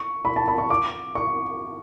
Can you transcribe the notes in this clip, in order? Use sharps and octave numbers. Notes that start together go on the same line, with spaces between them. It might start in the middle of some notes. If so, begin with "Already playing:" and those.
Already playing: C#6
B5
A5
B5
C#6
D6
C#6